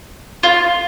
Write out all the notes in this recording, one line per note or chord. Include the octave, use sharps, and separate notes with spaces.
F4